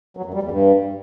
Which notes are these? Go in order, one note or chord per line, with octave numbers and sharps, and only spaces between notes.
F#3
F#2
G3
E2
G2